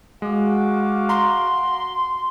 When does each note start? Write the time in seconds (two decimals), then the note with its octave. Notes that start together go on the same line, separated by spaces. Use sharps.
0.22 G#3 F#4 F5 D6
1.09 A#5 C6